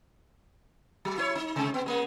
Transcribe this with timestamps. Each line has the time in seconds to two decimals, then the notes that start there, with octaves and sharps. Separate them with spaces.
1.05 F#3
1.18 E4 C5 C#5
1.35 D#4
1.56 C3 G#3
1.74 B3
1.86 G#3 A#3